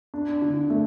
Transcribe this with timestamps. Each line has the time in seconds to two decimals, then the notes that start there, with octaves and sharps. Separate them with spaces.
0.14 D4
0.42 D3
0.70 A3